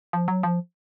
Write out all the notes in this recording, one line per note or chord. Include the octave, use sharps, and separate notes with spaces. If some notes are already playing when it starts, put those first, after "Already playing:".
F3
F#3
F3